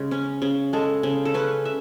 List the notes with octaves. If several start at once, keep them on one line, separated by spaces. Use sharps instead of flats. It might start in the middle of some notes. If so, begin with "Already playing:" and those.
Already playing: C#3 G#3
C#4
C#3
G#3 A4
C#3
A4
C#4 B4
E5